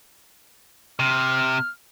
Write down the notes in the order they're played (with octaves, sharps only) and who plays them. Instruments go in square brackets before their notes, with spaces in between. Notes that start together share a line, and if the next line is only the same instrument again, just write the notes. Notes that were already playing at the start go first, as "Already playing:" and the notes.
[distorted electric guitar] C3 [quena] F6